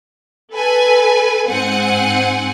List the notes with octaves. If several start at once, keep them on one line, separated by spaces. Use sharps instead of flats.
A4 B4 G#5
G#2 C4 F#5 G#5 C#7